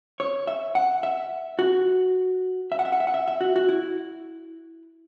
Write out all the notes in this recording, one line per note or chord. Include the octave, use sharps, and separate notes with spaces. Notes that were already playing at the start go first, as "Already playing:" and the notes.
C#5
E5
F#5
E5
F#4
E5
F#5
E5
F#5
E5
F#5
E5
E5
F#4
F#4
E4